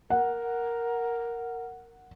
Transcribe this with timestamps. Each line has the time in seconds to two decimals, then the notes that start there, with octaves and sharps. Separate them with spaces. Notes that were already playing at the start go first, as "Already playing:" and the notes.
0.10 A#4 F#5